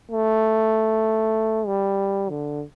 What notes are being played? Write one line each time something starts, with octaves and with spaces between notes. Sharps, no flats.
A3
G3
D3